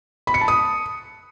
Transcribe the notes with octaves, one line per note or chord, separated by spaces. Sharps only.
B5
C#7
A5
D#6